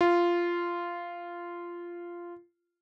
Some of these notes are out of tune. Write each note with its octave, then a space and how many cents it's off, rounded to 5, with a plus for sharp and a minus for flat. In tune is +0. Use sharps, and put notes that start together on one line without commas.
F4 -10